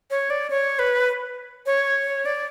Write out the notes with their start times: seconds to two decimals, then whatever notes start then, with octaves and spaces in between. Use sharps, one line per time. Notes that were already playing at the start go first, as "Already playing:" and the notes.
0.10 C#5
0.30 D5
0.50 C#5
0.79 B4
1.66 C#5
2.26 D5